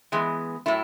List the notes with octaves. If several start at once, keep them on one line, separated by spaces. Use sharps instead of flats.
E3 G#3 B3
A2 F#3 A3 E4